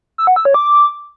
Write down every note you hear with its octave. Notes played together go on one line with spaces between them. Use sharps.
E6
F#5
E6
C#5
D6